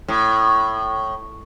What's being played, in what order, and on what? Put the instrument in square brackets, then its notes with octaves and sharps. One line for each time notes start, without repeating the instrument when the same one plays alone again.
[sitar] A2